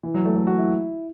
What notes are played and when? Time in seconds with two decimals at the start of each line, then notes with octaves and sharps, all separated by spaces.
0.03 E3
0.14 F#3
0.25 A3
0.36 A3
0.47 F#4
0.58 E4